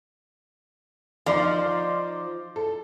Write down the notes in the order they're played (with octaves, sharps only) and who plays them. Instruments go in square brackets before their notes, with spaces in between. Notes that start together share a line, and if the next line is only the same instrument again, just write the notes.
[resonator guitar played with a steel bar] F3 [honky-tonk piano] D#4 D5 C6
[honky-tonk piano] A4